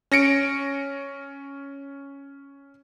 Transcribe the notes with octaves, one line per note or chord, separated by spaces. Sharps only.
C#4 A#6 C#7 D7